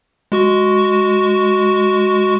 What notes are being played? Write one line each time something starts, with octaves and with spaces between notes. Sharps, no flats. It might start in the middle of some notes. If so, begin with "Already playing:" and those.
G#3 F#4 C#6